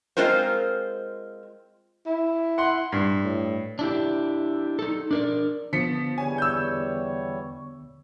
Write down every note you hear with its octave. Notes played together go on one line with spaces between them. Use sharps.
G#3 C4 F4 A#4 C5
E4
F#5 C6
G2
A2
D4 E4 G4
D#4 A4
D4 A#4 D5
D3 F3 B3 B6 C#7
E2 G3 C#5 G#5
E6 G6